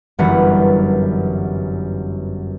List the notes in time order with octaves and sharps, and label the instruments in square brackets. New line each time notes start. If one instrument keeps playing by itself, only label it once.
[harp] G1 F#2 E3 F#5